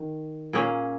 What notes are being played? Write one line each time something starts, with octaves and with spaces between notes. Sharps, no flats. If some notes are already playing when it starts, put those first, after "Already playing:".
Already playing: D#3
A#2 A#3 C#4 G#4